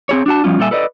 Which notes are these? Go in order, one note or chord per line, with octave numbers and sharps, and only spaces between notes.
C4 G#4 C#5
D4 F#4 A5
F3 G3 C#4 F4
A#2 G3 A4 E5 G#5
A4 B4 D5 D#5